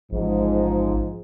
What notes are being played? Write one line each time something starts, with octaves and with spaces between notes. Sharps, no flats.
A1 G#2 F3